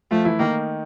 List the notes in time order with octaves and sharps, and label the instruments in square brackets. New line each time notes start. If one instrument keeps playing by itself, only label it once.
[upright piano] F3 F4 [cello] A3
[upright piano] E3 E4
[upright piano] D#3 D#4 [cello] A#3